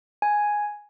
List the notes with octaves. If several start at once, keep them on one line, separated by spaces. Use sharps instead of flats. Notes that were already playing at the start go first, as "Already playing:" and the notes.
G#5